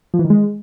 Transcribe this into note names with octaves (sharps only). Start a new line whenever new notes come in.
F3
E3
D#3
G#3